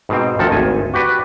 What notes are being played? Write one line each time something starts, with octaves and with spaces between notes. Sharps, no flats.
G#2 B2 C4
D2 D#3 F3 A4
G#1 D2 G#5
F#4 G4 B4 D5